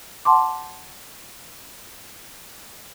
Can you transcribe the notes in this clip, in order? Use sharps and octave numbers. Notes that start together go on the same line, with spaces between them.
F#5 A5 C6 D6